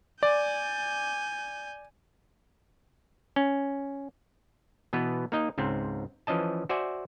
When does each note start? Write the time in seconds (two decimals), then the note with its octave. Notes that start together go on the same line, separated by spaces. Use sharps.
0.23 D5 G#5 G6
3.36 C#4
4.93 B2 E3 B3 B4
5.32 A#3 D#4 D#5
5.58 C#2 G#2 C4
6.27 E3 F3 C#4 D#5 A5
6.69 F#4 C5 D5 E5 G#5